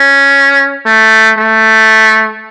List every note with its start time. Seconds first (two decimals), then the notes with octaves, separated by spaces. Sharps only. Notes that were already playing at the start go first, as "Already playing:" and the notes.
Already playing: C#4
0.86 A3
1.38 A3